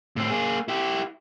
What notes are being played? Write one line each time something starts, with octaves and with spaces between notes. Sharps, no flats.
A2 C4
A#3 G#4
E4 G4